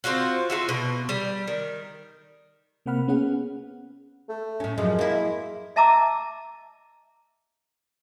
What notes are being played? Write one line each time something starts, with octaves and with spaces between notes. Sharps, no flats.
C4 F4 F#4 F#5
F4 F#4 E5
B2
G3
D#3
C3 A#3 C4 F#5 B5 F6
B3 C#4 G#4 F#5
A3
A2 C#4
F#2 F3 G#3
A#3 E4
D#5 E5 A5 A#5 D6 E6